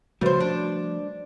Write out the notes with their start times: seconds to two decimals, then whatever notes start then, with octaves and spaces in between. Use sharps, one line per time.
0.21 C#3 F3 G3 A3 F#4 B4 C5
0.40 D4